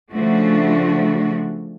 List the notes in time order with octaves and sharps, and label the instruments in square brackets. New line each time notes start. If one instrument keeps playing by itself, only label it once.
[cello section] C#3 F3 A3 D4 F#4